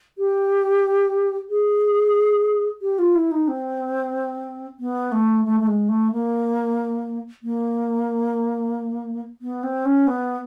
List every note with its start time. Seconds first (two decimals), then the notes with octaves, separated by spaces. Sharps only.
0.18 G4
1.50 G#4
2.82 G4
2.99 F4
3.15 E4
3.31 D#4
3.48 C4
4.80 B3
5.12 A3
5.45 A3
5.60 A3
5.67 G#3
5.89 A3
6.12 A#3
7.43 A#3
9.42 B3
9.63 C4
9.85 C#4
10.07 B3